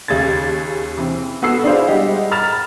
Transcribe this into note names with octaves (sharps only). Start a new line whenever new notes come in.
D#2 C#3 G#6 A6
E3 C4
B3 F#4 A4 E6 C7
D4 E4 G#4 C5 F5
G3 G#3 G4 D#5 F#5
A#5 B5 F6 A6 E7 F7